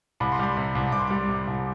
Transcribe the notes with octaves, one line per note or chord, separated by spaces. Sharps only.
C2 B5
C6
G3 B5
C3
C2
C2 D6
C6
G3 D6
C3
C2